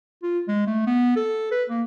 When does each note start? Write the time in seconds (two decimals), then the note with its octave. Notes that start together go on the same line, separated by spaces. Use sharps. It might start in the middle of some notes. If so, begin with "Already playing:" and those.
0.23 F4
0.48 G#3
0.67 A3
0.87 B3
1.16 A4
1.51 B4
1.69 A#3